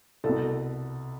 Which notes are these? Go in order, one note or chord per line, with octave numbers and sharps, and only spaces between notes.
C2 B2 A4